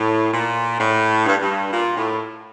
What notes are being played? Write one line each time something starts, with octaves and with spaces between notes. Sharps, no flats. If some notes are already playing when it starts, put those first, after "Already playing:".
Already playing: A2
A#2
A2
G2
G2
A#2
A2